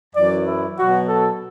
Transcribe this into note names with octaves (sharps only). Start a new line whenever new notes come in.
F#2 E3 D5
E4
B2 F#3 F#4
A4